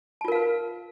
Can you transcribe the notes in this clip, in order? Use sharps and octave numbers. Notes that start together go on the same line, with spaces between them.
F4 A#4 B4 F5 A5